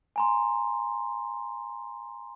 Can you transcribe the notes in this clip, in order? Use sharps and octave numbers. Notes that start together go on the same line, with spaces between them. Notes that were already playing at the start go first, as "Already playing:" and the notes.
G#5 A#5 C6